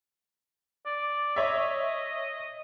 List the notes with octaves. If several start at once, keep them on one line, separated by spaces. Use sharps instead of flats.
D5
C#5 D#5 E5